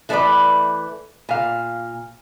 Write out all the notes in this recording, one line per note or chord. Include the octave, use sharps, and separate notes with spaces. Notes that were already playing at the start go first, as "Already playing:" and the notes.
E3 A3 C#4 D#4 B4 D5
A#2 F5